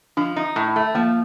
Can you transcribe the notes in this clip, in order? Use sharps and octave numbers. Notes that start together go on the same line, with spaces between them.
F3 D4
D#4
A2
A3
F3 A#3